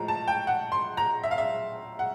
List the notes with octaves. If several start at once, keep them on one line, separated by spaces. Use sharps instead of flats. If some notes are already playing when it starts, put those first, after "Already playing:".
Already playing: A2 F3 G#3 A#5
A5
G5
F#5
C6
A#5
E5
F5
E5
F#5